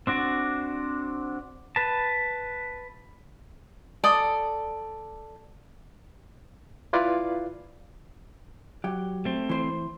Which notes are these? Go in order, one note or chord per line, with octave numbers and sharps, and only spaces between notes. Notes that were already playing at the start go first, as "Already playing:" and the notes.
C4 D4 F#4 D5
B4 A5
A4 D5 D#6
E4 F4 B4 D5 F5
F#3 G4
A3 C4
E3 C5